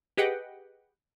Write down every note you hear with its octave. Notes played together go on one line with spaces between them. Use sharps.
G4 G#4 B4 D#5 F#5 G5